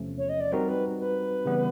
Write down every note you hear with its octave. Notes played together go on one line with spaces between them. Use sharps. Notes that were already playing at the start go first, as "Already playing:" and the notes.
Already playing: E2 C3 F3 A3 C#4
C#5
D#5
D5
G3 C4 D#4 F#4 A#4
B4
B4
C#3 E3 G3 B3